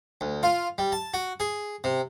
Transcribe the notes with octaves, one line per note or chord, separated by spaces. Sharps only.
D2
F4
G3
A5
F#4
G#4
C3